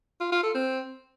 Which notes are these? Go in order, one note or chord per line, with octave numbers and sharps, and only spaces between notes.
F4
F4
A4
C4